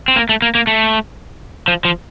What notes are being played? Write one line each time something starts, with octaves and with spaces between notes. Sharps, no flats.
C4
A#3
A3
A#3
A#3
A3
F3
F3